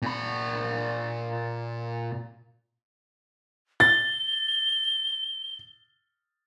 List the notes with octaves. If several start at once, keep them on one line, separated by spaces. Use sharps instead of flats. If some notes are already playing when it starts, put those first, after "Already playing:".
A#2 B5
A6 G7